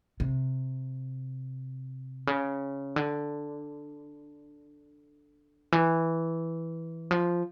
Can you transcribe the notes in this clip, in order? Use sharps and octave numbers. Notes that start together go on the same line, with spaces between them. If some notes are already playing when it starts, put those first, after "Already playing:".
C3
C#3
D3
E3
F3